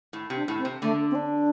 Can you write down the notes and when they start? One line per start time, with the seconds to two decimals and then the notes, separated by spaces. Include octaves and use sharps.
0.13 A2
0.30 C3
0.36 D4
0.48 A2
0.59 C4
0.65 C3
0.82 D3 A3
1.10 C4
1.15 D4